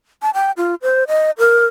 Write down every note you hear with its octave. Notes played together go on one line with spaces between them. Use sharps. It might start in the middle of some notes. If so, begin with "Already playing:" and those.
A5
G5
F4
C5
D#5
A#4